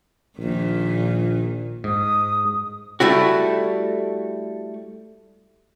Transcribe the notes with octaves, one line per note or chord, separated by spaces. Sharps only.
A#1 A#2 D#3
G#2 D#6
G3 A3 E4 F#4